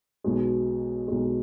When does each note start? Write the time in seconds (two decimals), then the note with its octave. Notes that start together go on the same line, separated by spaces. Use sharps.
0.24 B1 B2 G#3
1.08 B1 B2 G#3